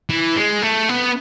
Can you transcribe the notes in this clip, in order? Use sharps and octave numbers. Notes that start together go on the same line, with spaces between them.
E3
G#3
A3
B3